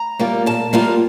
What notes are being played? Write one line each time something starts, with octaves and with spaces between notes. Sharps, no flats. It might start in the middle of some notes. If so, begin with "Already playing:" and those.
Already playing: A#5
G3 A#3 F4
A#2 A5
G3 A#3 F4